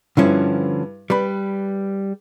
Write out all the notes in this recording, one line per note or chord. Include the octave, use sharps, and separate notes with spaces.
G2 D3 F3 C#4 E4
G3 B4 B5